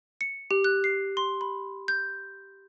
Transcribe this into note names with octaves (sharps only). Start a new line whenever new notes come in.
C#7
G4
F#6
C7
C6
B5
G6